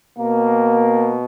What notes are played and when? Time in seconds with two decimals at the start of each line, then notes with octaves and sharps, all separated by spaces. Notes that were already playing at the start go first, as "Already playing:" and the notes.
0.19 B2 A#3